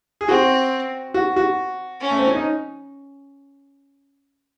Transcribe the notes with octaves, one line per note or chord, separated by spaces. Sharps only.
G#4
C4 F#4
F#4
F#4
C#4
A3
C4
C#4
D#4